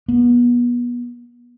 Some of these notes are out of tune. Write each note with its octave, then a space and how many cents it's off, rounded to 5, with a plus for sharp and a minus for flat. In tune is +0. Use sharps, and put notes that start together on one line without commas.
B3 -30